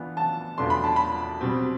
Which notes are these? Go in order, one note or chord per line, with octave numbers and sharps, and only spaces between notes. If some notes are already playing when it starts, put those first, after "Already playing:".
Already playing: E3 B3 D4 F4
A5
E2 B2 A3 D4 F4 C6
B5
A5
B5
B2 G3 C4